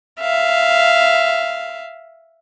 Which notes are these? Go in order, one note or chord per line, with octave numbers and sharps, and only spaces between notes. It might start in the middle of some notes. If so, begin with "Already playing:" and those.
E5 F5